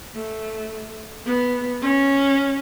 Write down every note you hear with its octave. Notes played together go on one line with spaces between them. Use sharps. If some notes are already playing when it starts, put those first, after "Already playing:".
A3
B3
C#4